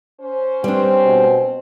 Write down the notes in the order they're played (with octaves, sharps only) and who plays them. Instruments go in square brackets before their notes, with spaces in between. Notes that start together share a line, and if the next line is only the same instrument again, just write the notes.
[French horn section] C#4 C5
[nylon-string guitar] G3 D4 [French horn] C4 [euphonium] B4
[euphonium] B2